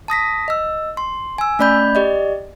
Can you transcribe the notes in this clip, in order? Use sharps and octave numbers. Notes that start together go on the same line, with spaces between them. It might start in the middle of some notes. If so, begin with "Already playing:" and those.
A5 D#6 A#6 B6
D#5 E6
C6
G#5 E6
A3 C#4 D5 B5 G6
G4 D5 D#5